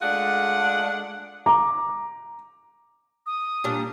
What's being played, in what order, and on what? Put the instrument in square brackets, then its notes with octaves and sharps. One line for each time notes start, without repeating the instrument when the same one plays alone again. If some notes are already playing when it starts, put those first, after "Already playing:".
[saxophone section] G#3 A3 D4 F4 G#4 F#5
[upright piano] A#5 D6
[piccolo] D#6
[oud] A#2 G3 D4